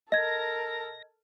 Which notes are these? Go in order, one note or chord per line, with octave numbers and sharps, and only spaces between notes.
A4 A#4 D#5 G#6 A#6